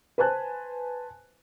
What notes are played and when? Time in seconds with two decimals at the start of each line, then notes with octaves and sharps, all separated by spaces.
0.18 B4 C5 G#5 A5 F#6